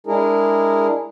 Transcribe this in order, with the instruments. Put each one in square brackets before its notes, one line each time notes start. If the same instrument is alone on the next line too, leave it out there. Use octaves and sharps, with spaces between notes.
[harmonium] G#3 D4 E4 G#4 A#4